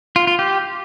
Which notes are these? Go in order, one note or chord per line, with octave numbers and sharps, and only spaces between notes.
F4
F4
G4